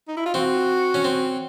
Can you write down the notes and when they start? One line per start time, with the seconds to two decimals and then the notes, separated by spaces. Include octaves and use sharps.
0.08 D#4
0.17 E4
0.26 F4
0.34 C4 F#4
0.94 C#4
1.04 C4